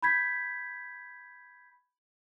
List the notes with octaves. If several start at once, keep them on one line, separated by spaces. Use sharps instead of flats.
B5 G6 G#6 B6